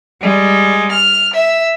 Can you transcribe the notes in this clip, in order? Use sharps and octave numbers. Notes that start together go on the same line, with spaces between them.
G3 G#3
F6
E5